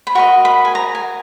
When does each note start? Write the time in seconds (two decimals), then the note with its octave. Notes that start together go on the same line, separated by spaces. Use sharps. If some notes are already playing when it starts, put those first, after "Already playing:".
0.07 B5
0.15 F#4 A#4 D#5 C#6
0.45 B5
0.65 G#5
0.75 A#5
0.95 G#5